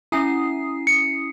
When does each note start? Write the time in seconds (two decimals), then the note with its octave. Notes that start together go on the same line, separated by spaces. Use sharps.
0.12 C#4 E4 G#5 A#5 D#6 C7
0.87 C#7